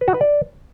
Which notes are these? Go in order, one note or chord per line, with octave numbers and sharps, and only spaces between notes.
B4
F#4
B4
D5